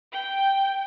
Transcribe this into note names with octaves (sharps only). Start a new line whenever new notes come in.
G5